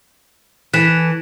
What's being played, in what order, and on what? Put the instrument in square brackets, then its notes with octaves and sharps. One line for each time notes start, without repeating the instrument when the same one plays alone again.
[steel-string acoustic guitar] E3 A4 [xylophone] F#6 B6 E7